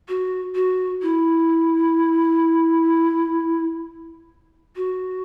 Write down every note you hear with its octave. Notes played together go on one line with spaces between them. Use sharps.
F#4
F#4
E4
F#4